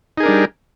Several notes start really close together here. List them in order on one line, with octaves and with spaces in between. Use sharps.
D#4 G#4 A#4 D4 G3